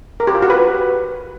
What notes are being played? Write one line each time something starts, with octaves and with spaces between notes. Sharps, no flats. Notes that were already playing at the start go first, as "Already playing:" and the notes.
A#4
G4
F4
F#4
B4